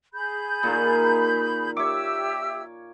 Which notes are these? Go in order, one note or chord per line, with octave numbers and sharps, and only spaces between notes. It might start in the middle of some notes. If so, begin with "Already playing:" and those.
G#4 B5 G6
A#2 D#3 F4
G4 C#5 E5 D6 E6